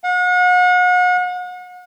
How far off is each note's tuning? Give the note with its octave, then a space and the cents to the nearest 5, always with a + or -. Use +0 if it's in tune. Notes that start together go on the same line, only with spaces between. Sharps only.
F#5 -40